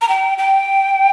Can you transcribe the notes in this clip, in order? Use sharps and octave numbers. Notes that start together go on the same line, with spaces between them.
A#5
G5
G5